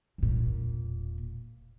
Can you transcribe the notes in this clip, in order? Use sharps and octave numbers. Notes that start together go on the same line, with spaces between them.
E1 A#2